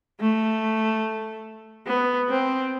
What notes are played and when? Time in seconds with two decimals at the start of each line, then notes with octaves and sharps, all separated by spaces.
0.20 A3
1.87 B3
2.29 C4